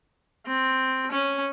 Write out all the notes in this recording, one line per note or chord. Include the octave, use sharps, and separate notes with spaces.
C4
C#4